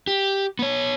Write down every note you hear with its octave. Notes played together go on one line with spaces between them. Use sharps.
G4
B3 C#5